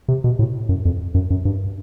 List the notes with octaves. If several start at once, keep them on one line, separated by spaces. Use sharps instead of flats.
C3
B2
A2
F#2
F2
F#2
F#2
G2